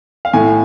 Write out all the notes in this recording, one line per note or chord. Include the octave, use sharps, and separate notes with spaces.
F5
A2 G#5